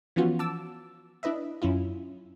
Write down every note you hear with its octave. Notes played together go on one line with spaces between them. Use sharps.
E3 F3 B3 C#4 F4 F#4
A5 D6 E6
D4 E4 B4 D#5 E5
F#2 C#4 E4 F4